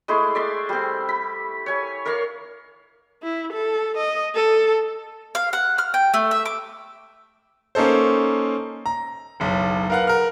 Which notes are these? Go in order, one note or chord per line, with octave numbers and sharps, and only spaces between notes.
G#3 A3 E4 C6
D5 E5 C6
G3 C4
B5
C#5 G#5
A#4 C#5 D5 F5
E4
A4
D#5
A4
F5
F#5
F6
G5
A3
E5
D6
A#3 C#4 D#4 A4 C5
A#5
F#1 B1
A#4 B4 F5 F#5 F#6
A#4 F6